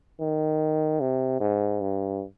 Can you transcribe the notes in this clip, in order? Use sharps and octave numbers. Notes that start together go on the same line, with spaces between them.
D#3
C3
G#2
G2